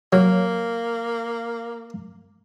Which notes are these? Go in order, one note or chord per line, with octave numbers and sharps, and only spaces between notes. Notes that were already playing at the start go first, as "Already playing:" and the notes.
F#3 A#3